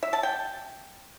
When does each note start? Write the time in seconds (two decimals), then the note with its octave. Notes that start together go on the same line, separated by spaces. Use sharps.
0.03 E5
0.13 A5
0.23 G5